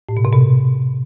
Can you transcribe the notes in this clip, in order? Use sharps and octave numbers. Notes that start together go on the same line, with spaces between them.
A2
B2
C3
B2